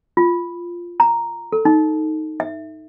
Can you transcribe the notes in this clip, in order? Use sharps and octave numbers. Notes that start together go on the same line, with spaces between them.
F4
A#5
A4
D#4
E5